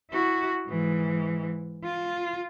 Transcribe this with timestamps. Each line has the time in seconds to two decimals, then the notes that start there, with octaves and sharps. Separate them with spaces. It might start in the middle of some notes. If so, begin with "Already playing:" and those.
0.11 E4 F#4
0.68 G#2 E3
1.84 F4